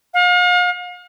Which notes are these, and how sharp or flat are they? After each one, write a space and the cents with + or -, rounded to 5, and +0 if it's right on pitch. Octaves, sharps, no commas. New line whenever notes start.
F5 +40